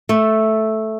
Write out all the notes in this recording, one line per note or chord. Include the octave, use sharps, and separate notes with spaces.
A3